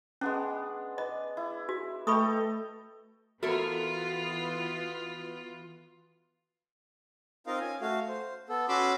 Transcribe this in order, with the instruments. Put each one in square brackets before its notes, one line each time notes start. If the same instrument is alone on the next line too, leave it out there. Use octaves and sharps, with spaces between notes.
[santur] G#3 B3 D4 [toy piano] C#4
[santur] B4 [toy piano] D#5
[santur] E4
[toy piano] F#4
[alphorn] A3 [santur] A4 D#5 G5 [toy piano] B5 C#6 D#6
[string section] E3 B3 F4 [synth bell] F#4 [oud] A4 A#4 C#5
[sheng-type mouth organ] C4 D#4 F4 A#4 D#5 F5
C#4 G#5
A3 F#4 F5
C5
B3 A4
C#4 F#4 B5 C6 D6 E6